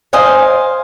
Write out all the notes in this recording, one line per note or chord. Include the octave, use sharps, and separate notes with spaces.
C5 D#5 F5 G#5